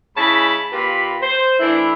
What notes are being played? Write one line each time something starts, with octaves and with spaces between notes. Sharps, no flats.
C#3 G#3 E4 A5 B5
A#2 F4 G4 B4 B5
C5
E3 A3 D4 E4